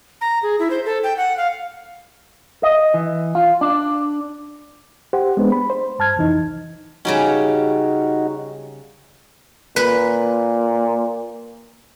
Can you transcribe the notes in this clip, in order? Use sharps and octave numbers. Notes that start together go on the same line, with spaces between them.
A#5
G#4
E4
C5
A4
G5
F#5
F5
D#5
E3
F4
D4
G4 C5 F#5
G#3 B3 D4 B4
B5
C5
G2 A5 F6 G#6
C2 F2 E3 D#4
C#3 G3 C#4 D#4 F#4
A#2 B4